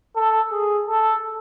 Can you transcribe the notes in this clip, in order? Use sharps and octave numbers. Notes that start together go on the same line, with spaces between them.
A4
G#4
A4